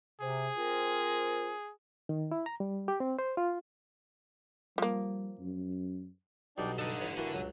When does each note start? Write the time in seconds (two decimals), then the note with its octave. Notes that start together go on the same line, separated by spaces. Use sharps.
0.21 C3 G#4
0.57 C4 F4 A#4
2.09 D#3
2.32 E4
2.46 A#5
2.60 G3
2.88 G4
3.00 C4
3.19 C5
3.37 F4
4.78 F3 G3 A#3
5.40 F#2
6.58 B1 B2 G3 D4 D#4 D5 G5
6.79 G2 D#4 A4 F#5
7.00 A1 B4 C#5
7.17 E3 A#3 E4 F#4
7.33 C#2 F#3